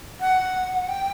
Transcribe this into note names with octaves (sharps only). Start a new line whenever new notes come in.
F#5
G5